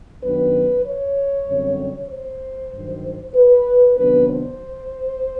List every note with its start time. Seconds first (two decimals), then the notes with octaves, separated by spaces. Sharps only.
0.23 F#2 D#3 F#3 B3 D4 B4
0.85 C#5
1.48 F#2 D3 G3 C4
2.09 C5
2.73 G2 D#3 F#3
3.35 B4
3.97 C3 D#3 F#3 B3 D4 B4
4.29 C5